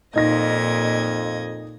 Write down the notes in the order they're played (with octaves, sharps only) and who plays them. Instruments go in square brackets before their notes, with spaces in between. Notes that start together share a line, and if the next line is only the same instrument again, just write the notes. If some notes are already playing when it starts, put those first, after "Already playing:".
[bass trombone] F2 [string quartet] A#2 D#5 G#6 [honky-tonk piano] D#4 A#6